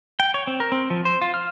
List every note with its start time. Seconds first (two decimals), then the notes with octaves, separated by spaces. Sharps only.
0.20 G5
0.34 C#5
0.47 C4
0.60 A#4
0.72 C4
0.90 F3
1.05 C5
1.22 F4
1.34 F6